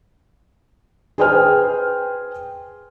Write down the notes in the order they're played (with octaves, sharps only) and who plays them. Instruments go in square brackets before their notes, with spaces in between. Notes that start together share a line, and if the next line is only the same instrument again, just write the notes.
[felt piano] G#4 B4 C5 G5 G#5 F6